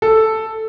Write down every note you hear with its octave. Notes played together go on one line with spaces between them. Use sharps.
A4